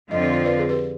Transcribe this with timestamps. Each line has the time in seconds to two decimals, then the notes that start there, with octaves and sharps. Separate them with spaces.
0.10 F2 D3 F3 C4 F4 D#5
0.22 D5
0.33 C5
0.45 B4 D5
0.59 G#4
0.69 G4 B4